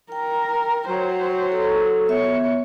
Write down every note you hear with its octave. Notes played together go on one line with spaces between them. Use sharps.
A#4 G5
F#3 C5
A4
B3 C#5 E5